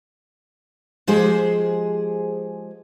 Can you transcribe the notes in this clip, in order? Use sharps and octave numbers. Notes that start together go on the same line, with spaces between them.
F3 G#3 G4 G#4 C5